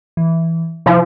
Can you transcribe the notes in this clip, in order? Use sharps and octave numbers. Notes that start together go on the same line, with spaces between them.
E3
C3 F3 E4